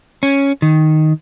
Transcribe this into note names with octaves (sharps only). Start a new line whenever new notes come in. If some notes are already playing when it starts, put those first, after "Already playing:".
C#4
D#3